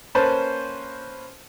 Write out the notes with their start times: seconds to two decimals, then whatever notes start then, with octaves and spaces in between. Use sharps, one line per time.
0.15 A#3 C#4 B4 C5 A5